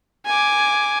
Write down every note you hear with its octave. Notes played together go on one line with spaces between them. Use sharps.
G#5 D6